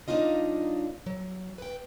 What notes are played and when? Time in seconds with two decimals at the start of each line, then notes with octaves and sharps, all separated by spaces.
0.08 F#3 A#3 D4 D#4 F4 D#5
1.06 F#3
1.58 B4 G5